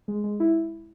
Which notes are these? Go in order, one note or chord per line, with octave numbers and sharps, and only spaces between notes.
G#3
G#3
E4